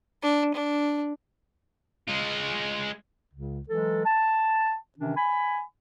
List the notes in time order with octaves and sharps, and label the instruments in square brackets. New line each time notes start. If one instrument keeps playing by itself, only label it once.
[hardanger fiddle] D4
D4
[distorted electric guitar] G#3 F4
[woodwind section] C#2 C#3
E3 F#3 G#3 A4
A5
C3 D#3 E3 C#4 D4
G#5 B5